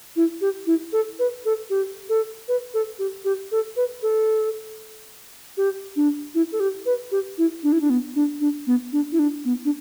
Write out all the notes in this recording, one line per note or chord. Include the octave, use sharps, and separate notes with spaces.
E4
G4
E4
A4
B4
A4
G4
A4
B4
A4
G4
G4
A4
B4
A4
G4
D4
E4
A4
G4
B4
G4
E4
D4
E4
D4
B3
D4
D4
B3
D4
E4
D4
B3
D4